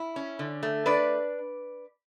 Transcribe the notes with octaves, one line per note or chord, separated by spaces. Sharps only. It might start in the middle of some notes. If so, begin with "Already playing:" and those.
Already playing: E4
C#4
D3
A3
D4 B4 D5